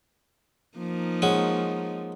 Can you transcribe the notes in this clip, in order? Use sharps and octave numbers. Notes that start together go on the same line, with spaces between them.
F3 A#3 D#4
G#3 C#4 F#4